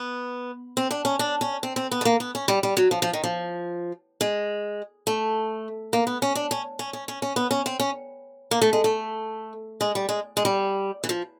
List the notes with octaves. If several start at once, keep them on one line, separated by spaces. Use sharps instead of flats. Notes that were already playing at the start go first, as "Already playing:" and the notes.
Already playing: B3
C4
D4
C#4
D4
C#4
C4
C4
B3
A3
A#3
B3
C#4
G3
G3
F#3
F3
F3
D#3
F3
G#3
A3
A#3
B3
C#4
D4
C#4
C#4
C#4
C#4
C#4
B3
C#4
C4
C#4
A#3
A3
G#3
A3
G#3
G3
G#3
G#3
G3
E3
F3